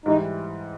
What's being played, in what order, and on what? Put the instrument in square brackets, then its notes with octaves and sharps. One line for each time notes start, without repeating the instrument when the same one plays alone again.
[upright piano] G#2 E3 G3 [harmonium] D#4